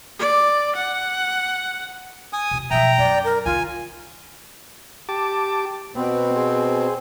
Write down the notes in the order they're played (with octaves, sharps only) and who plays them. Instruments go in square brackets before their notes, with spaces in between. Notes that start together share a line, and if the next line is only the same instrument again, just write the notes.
[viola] D5
F#5
[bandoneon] G#5 D#6
[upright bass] C3 F4
[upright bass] B2 F3 [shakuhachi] E5 [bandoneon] G5 A#5
[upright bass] F#2 [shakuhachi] D5
[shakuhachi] A#4
[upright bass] C2 D#3 [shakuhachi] F4 [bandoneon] G#5
[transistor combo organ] G4 A5 D6
[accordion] B2 C4 [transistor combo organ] B3
[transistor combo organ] G#4 C5